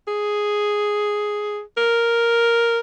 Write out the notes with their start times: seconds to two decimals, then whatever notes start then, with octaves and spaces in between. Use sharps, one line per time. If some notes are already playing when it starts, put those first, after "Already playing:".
0.08 G#4
1.77 A#4